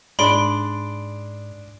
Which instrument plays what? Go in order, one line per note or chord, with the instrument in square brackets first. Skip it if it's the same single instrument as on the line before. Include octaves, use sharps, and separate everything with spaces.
[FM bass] G#2 [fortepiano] D4 G#4 D5 [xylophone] B5 C6 D7